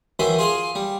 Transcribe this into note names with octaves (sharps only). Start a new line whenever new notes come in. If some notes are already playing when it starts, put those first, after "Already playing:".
D#3 E3 F#3 B5 C6
F4 G#4 F5 C6
G3